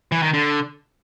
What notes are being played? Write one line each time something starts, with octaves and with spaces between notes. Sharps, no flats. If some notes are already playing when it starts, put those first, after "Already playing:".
E3
D#3
D3